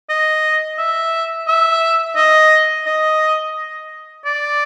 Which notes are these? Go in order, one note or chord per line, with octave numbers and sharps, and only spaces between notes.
D#5
E5
E5
D#5
D#5
D5